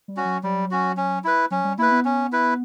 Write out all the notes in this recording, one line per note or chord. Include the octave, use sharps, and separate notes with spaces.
G3
C#4 F#4
F#3
F#3 G3
C#4 F#4
C#4
E4 B4
F#3 C#4
G3
A#3 E4 B4
B3
C#4
E4 B4